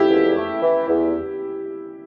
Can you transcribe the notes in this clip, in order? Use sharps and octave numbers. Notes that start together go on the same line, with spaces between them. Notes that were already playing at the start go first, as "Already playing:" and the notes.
Already playing: F2 E4 G4
E2
A3
E3
E2